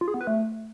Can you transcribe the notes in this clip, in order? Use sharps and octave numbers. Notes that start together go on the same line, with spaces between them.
F4
G#4
B3
B4
A3